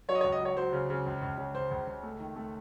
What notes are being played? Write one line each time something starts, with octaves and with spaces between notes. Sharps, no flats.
F#3 C#5
D#5
C#5
C#2
D#5
F#3 C#5
F#3 C5
C#3
C#3
C#2
C#2
C#3
C#2 C5
C#2
C#2
A3
D#3
A3